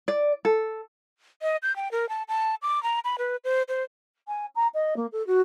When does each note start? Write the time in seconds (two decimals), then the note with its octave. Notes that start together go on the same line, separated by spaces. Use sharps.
0.08 D5
0.45 A4
1.42 D#5
1.63 G6
1.76 G5
1.92 A#4
2.09 A5
2.28 A5
2.62 D6
2.83 A#5
3.04 B5
3.18 B4
3.44 C5
3.69 C5
4.28 G#5
4.55 A#5
4.74 D#5
4.96 A#3
5.12 A4
5.27 F#4